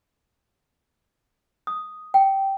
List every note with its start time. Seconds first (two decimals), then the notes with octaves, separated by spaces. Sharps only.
1.67 D#6
2.14 G5